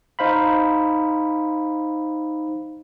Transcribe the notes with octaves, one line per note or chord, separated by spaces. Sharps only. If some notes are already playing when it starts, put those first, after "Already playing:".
D#4 C5 F5 B5